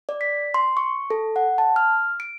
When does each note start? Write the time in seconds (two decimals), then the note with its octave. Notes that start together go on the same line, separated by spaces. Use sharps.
0.09 D5
0.21 B6
0.54 C6
0.77 C#6
1.10 A4
1.36 F#5
1.58 A5
1.76 F6
2.20 D7